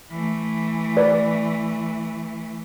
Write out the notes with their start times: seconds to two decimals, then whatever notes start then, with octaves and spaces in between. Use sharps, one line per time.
0.11 E3 A3
0.97 B4 D5